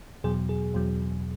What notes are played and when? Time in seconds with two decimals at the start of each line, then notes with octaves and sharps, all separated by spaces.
0.24 E2 B2 F#3 G#4
0.49 G#4
0.74 E2 B2 F#3